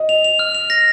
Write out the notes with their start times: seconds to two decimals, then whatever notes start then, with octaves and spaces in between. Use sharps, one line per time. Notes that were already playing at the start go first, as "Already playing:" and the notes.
Already playing: D#5
0.09 F7
0.24 F7
0.39 F6
0.55 F7
0.70 A#6